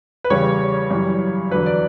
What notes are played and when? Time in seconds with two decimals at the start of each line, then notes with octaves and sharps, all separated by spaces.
0.24 B4
0.30 E2 C#3 G3 C#5
0.91 F#2 E3 G3
1.51 E2 D3 F#3 B4
1.66 D5